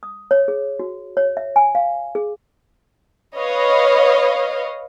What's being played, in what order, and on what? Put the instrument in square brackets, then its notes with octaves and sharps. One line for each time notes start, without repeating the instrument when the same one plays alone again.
[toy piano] D#6
C#5
G#4
F#4
C#5
E5
G#5
F5
G#4
[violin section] B4 C#5 D#5 F5